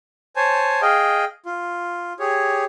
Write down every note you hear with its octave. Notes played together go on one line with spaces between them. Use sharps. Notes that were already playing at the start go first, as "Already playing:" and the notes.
C5 C#5 G#5 A5
G#4 D#5 F5 G5
F4
G4 G#4 C#5